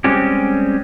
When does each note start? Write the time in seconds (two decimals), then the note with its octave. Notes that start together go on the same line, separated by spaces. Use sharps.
0.04 G3 G#3 C4 C#4 G4